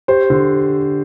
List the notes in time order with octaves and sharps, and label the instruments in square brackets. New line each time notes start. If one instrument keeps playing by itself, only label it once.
[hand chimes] G4 [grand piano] C5
[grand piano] D3